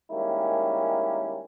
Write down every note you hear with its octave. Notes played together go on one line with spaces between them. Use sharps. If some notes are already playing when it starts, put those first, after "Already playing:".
D#3 G3 G#3 A#3 C#4 E4